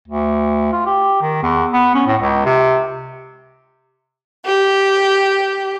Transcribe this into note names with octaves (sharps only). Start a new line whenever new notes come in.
D2
F4
G4
D#3
E2
B3
C#4
A2
C#2
C3
G4